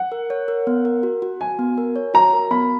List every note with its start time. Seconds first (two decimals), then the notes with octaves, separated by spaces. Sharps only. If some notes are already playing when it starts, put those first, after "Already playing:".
Already playing: F#5
0.12 A#4
0.30 C#5
0.48 A#4
0.67 B3
0.85 A#4
1.03 F#4
1.22 F#4
1.41 F#4 G#5
1.59 B3
1.78 A#4
1.96 C#5
2.14 F#4 A#5
2.33 A#4
2.51 B3 B5